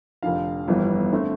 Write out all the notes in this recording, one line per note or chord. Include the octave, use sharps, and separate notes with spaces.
F1 F2 D3 F5
G1 F2 E3 G3 B3
D3 A3 C4